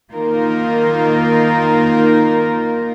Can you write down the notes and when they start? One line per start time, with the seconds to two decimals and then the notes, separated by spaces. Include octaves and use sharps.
0.11 D#3 A#3 D#4 F4 A#4